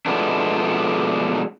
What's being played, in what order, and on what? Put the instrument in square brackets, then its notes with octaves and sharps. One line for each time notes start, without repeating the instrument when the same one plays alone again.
[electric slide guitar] B2 F3 G#3 A3 B3 D4